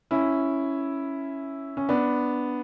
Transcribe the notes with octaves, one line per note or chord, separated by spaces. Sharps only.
C#4 E4
C#4
B3 D4